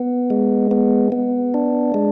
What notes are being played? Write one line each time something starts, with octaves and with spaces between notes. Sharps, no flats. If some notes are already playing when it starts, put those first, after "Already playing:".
Already playing: B3
G#3
B3
B3
D4
G#3